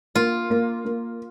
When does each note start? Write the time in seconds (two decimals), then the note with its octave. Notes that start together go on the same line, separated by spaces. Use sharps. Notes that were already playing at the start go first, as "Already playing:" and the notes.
0.15 A#3 F4
0.50 A#3
0.85 A#3